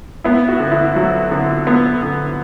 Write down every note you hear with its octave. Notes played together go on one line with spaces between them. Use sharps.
B3 E4
F#4
D3
E4
F#3 F#4
D3
B3
D3